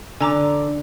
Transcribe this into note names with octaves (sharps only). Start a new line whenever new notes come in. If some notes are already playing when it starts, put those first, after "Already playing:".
D3 G#5 A#5 D6